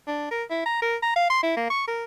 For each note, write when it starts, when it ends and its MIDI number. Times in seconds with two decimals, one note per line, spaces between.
0.07 0.26 62
0.31 0.43 70
0.50 0.65 64
0.66 0.77 82
0.82 0.96 70
1.02 1.14 82
1.16 1.29 77
1.30 1.41 84
1.43 1.56 64
1.57 1.68 58
1.70 1.83 85
1.87 2.04 70